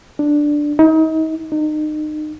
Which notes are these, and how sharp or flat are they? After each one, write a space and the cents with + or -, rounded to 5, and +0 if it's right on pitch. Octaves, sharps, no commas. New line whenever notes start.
D4 +5
D#4 +35
D#4 -30